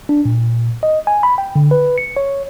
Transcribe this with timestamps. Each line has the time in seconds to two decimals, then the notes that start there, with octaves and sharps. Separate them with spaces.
0.09 D4
0.25 A#2
0.83 D#5
1.07 G#5
1.23 B5
1.38 G5
1.56 D3
1.71 B4
1.98 C#7
2.17 C#5